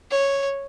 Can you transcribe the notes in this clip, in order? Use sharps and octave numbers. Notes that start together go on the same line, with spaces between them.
C#5